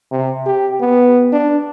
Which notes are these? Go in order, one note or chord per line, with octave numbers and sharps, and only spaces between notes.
C3
G4
B3
D4